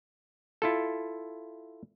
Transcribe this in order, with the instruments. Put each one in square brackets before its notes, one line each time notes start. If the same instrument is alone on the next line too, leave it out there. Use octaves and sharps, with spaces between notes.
[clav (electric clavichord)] E4 F4 A4